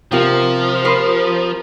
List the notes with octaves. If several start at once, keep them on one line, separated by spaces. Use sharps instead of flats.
C3 F3 F4 A#4
A#4 B5 C6